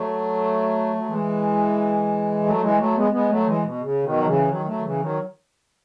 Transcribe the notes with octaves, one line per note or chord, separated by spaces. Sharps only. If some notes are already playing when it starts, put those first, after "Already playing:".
Already playing: F#3 A3
F#3
E3 G#3
F#3 A3
E3 G#3
F#3 A3
G#3 B3
G#3 B3
F#3 A3
E3 G#3
B2
C#3
B2 D#3
F#3
C#3 E3
D#3 F#3
F#3 A3
D#3
C#3 E3
D#3 F#3